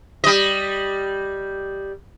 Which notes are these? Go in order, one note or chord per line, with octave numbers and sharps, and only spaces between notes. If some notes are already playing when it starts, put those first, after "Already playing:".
G3 D#5